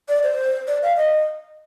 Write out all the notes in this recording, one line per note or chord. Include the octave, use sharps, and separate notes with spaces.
D5
C5
D5
F5
D#5